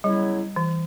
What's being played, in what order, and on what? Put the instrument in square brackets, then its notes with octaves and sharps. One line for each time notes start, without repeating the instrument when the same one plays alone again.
[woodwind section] C#3 F#3 B3 E4 [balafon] G3
[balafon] E3